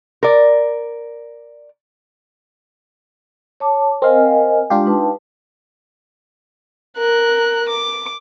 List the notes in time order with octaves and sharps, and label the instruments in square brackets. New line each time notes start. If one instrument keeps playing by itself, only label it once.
[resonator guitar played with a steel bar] A#4 D5
[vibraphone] C#5 A5 D6
[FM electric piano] C4 F5 [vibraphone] A#4 D#5 G#5
[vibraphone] G#3 [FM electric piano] D4 F4 G4
[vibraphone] D#4 B4 A5
[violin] A#4 F#6
D6